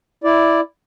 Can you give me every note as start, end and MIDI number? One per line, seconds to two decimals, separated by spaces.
0.24 0.60 64
0.24 0.60 74